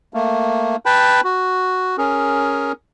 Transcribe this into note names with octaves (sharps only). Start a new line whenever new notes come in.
A3 A#3
B4 G5 A5 B5
F#4
C#4 G#4 A#4